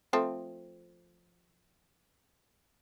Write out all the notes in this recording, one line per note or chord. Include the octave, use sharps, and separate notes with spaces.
F3 A3 C4